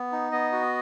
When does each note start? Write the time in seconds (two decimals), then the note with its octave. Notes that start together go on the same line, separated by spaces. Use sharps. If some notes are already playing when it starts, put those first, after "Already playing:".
Already playing: B3
0.12 D#4
0.32 B3 D#5
0.52 F#4